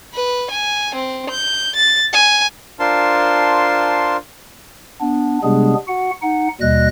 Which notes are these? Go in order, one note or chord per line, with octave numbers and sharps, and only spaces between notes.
B4
G#5
C4
G6
A6
G#5
D4 F4 A#4 C5 A5 C6
B3 D4
C3 G3 G#3 B3 D4 G#4
F#4 F#5
D#4 F#5
D#2 B2 G3 D#5 F#6 A#6